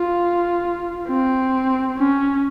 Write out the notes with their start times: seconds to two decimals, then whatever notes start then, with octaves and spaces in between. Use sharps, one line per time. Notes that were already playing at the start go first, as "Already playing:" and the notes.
Already playing: F4
1.08 C4
1.98 C#4